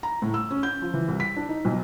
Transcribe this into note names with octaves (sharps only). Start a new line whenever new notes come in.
A#5
A2
E6
C#4
G6
F3
E3
C2
B6
D4
D#4
B1